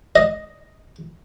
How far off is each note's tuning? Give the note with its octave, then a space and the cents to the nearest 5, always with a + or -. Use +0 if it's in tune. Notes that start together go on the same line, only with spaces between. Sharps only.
D#5 +0